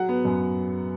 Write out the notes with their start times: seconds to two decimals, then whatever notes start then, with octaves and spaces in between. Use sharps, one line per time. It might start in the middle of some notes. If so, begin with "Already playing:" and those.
Already playing: F#3 F#5
0.09 B3
0.25 F#2